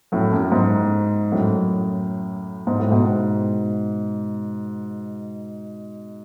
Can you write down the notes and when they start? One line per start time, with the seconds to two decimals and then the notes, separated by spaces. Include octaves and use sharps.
0.12 F#2 A2
0.33 F#2
0.52 G#2
1.32 F#2 A2
2.67 G#2
2.80 A2
2.92 G#2 B2